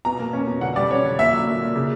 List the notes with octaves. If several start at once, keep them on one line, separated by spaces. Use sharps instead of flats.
B2 A#5
A#3
C#4
B2
D3 F#5
G3 D5
C#4 C#5
D3
A#2 E5
F#3
A#3
A#2
C#3